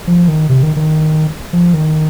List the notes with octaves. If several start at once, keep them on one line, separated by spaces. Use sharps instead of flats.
F3
D#3
C3
D#3
D#3
F3
D#3